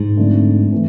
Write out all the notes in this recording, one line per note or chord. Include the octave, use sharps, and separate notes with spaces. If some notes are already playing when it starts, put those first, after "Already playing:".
Already playing: G#2
F2 D3 A3 D4
E3 A3 C4